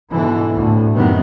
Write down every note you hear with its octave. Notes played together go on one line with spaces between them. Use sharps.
G#2 B2 D3 E3
D2 A2
F#2 C3 D#3 B3